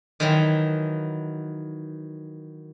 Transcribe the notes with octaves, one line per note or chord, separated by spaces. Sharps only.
D#3 E3 F#3